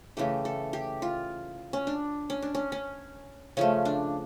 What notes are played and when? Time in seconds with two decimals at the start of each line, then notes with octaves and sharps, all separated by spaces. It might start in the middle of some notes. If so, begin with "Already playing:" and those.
0.17 C#3 E3 A3 G4
0.45 A4
0.73 G4
1.02 F4
1.73 C#4
1.87 D4
2.30 C#4
2.42 D4
2.55 C#4
2.72 C#4
3.57 C#3 F3 A3 C#4
3.85 D4